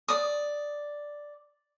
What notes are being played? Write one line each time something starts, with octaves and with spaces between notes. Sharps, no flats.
D5 D#6